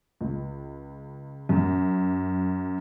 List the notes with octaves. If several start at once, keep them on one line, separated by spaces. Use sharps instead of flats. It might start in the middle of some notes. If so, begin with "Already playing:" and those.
C#2
F#2